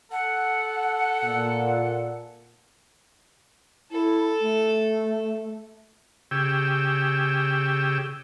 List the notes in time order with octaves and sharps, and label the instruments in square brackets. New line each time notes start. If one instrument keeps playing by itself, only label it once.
[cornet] A4 [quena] F#5
[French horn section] A#2
[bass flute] E4 [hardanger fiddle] A4
[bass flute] A3
[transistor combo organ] C#3 G4 G#4 G5 E6